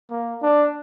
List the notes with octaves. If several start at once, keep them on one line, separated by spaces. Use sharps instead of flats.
A#3
D4